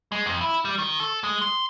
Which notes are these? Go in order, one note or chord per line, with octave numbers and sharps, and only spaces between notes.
G#3
F2
E4
G3
D#3
A4
G#3
C6